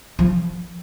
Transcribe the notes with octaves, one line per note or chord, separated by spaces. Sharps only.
F3